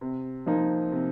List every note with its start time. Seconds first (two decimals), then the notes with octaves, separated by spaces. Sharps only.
0.01 C3
0.46 F3 A#3 D#4
0.92 C3